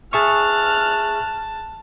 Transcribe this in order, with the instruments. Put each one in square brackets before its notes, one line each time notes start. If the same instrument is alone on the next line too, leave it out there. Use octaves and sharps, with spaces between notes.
[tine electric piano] G#4 E5 C#6 [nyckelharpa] A5 [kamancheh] F6 F#6